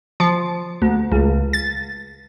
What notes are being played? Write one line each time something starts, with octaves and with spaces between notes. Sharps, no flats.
F3
D2
C#2
A6